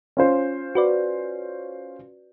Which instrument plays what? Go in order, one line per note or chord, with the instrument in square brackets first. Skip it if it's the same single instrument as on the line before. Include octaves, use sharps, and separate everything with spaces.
[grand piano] C#4 F4 C5
[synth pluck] F#4 B4 D5